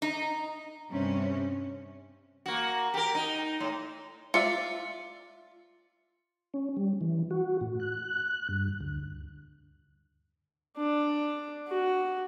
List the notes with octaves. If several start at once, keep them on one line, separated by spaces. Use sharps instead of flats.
D#4
G2 C3 C#4
A#3 F#4
G4 A#4
D#4
A2
F4 D5 E5 C#7
C#4
G3
E3
F#4
A2
F#6
G2
D2
D4
F#4